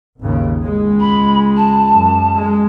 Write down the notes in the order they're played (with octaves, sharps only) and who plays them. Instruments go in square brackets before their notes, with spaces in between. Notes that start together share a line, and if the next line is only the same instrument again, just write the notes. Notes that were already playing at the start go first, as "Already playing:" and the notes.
[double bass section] G#1 D#2 C#3
C#2 G#3
[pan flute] B5
A5
[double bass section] F#2
G#3